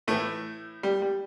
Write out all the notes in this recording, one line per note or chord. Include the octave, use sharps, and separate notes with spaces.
A2 E3 A3
G3
G3